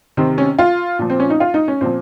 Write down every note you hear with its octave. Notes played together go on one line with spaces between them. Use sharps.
C3 D#3 C4
C#4
F4
A#2 F3
C4
C#4
D#4
F4
D#4
C#4
A#2 F3 C4